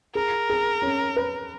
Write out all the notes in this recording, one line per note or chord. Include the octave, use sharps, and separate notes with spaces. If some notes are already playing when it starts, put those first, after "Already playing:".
G#4 A#4
G#4
C#4
B4